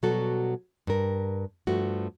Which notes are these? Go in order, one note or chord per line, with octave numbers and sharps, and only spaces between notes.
B2 F#3 G3 F#4 A4
G2 A#4
G2 F3 A3 F#4